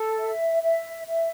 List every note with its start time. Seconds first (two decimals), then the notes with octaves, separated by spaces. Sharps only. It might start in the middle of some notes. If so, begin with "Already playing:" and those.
Already playing: A4
0.18 E5
0.62 E5
1.07 E5